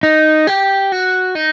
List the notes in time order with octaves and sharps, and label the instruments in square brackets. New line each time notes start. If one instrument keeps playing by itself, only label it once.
[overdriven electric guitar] D#4
G4
F#4
D#4